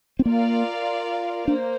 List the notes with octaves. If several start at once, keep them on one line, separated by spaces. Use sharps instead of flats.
C4
A#3 F4 A#4 D5 F5
A#3 D4 C5